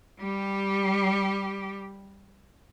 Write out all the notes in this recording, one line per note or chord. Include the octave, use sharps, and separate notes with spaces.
G3 G4